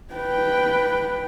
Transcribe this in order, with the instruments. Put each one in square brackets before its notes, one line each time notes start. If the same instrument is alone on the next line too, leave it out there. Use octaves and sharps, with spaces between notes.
[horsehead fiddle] B4 G5